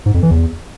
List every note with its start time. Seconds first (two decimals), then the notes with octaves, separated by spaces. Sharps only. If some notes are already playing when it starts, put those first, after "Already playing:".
0.06 G#2
0.14 F2
0.22 E3
0.31 E2